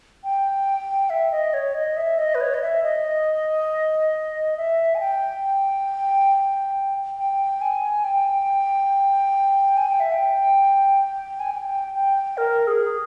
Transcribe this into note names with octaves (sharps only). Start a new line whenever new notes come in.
G5
E5
D#5
C#5
D#5
E5
D#5
B4
C#5
D#5
E5
D#5
E5
G#5
G5
G5
G#5
G5
G#5
G5
E5
G5
G#5
G5
G5
A#4
G#4